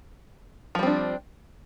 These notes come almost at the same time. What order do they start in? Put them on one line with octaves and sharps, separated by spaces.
F3 G3 C4 D4